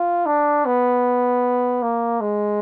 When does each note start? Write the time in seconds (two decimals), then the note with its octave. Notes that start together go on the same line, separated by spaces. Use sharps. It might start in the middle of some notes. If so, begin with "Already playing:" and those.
Already playing: F4
0.26 D4
0.66 B3
1.82 A#3
2.21 G#3